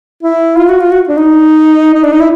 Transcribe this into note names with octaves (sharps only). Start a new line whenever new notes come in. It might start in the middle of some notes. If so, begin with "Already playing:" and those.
E4
F4
F#4
F4
F#4
D4
D#4
D#4
D4
D#4
E4